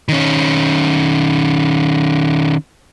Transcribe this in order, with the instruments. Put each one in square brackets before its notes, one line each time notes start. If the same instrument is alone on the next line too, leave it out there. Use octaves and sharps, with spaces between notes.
[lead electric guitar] D#3 C#4